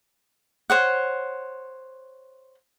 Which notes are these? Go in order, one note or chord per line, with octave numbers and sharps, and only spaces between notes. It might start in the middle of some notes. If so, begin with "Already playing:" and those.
C5 C#5 F#5